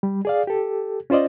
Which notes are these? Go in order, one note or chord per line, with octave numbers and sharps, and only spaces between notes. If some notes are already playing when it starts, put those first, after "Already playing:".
G3
G#4 D5 F5
G4 A4
C#4 F4 C5 D5 D#5